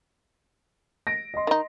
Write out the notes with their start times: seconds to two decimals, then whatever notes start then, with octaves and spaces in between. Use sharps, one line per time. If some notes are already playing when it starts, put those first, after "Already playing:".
1.07 A#6 D7
1.34 D#5 C6
1.47 D#3 D#4